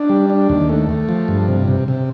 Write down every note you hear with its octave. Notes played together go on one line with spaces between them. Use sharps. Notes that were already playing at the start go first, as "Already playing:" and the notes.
Already playing: D4
G3
D4
D#2
A3
A3
F3
G2
C3
C3
C3